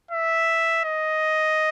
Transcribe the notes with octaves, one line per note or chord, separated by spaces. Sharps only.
E5
D#5